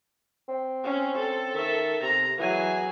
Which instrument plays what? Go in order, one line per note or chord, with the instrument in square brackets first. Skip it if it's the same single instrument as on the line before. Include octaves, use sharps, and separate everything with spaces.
[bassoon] C4
[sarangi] C#4
A4
[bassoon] D#3 [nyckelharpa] A#4 E5
[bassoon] C3 [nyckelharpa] A#5
[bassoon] E3 [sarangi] F#3 [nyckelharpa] G#4 G#5